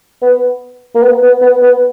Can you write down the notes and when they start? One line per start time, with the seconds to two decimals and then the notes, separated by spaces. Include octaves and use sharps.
0.22 B3
0.95 A#3
1.03 B3
1.23 B3
1.42 B3
1.63 B3